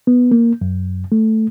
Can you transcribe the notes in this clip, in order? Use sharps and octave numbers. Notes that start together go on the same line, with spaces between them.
B3
A#3
F#2
A3